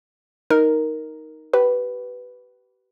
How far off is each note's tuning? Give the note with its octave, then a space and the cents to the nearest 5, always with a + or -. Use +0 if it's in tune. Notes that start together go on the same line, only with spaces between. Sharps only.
D#4 +5 A#4 +0
G4 -40 B4 +0